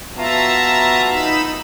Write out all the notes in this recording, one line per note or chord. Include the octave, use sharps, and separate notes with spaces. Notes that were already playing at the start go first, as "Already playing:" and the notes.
B3 F4 F#4 E5 A5 A#5
D#4 B5 E6